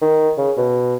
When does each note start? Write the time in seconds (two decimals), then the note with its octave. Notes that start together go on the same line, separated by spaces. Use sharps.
0.02 D#3
0.38 C#3
0.57 B2